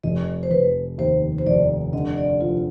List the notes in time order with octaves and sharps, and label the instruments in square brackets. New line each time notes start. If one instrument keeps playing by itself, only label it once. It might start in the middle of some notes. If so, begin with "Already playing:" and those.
[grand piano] F1 [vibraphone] D#5
[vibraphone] C5
[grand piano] F1 [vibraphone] B4
[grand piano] D#2 [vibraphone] C5
[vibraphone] C5
[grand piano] F1 [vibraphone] D5
[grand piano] D3 [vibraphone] D#5
[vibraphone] D5
[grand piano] F3 [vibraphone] F4